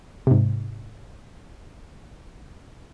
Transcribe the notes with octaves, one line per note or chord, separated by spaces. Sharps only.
G#2 C3